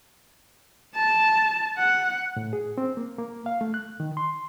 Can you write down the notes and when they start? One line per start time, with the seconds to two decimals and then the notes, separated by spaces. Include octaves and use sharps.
0.95 A5
1.78 F#5
2.36 A2
2.53 G#4
2.78 C4
2.97 A#3
3.18 A#3
3.46 F5
3.61 A3
3.74 F#6
4.00 D#3
4.17 C6